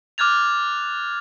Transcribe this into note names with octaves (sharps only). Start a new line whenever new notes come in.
D6 F6 F#6 G#6 A6 F7